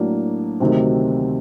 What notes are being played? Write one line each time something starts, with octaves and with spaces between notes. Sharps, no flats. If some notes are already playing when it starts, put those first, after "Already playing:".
Already playing: A2 F#3 A#3 D4
D2 C3 D#3 F#3 C4